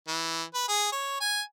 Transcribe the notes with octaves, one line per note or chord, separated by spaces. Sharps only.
E3
B4
G#4
C#5
G#5